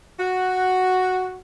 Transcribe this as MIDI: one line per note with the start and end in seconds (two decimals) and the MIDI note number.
0.19 1.37 66